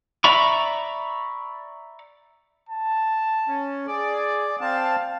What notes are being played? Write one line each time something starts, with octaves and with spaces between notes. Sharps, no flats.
D5 E5 A#5 B5 C#6
A5
C#4
G#4 D5
C4 F5 A5